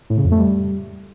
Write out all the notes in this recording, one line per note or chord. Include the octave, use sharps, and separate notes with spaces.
A2
C#3
F2
A3
G3